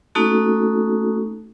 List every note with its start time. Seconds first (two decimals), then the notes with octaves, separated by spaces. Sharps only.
0.15 A3 A#3 C#4 D#4 F#4 A4